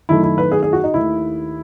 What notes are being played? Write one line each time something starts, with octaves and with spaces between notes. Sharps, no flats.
F#2 D#3 A3 E4
E4
B4
G#4
G#4
F#4
D#4
D#2 D#3 A3 E4